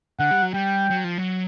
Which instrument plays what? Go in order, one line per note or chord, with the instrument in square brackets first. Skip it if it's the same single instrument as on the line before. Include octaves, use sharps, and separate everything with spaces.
[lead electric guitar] D3 [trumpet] F#5
[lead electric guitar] G3
F#3
[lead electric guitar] G3 [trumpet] G5
[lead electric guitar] F#3
F3
F#3